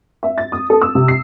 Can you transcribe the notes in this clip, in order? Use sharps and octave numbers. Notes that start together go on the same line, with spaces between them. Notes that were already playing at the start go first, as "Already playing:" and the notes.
E5
A6
D#6
A4
E6
C3
C7